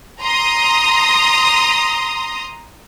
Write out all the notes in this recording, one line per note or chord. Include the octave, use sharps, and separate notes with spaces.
A#5 C6 D#6